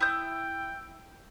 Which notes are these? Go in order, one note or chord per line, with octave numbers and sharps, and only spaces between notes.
E4 G5 D#6 G6